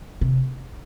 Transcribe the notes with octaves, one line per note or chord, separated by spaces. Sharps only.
C3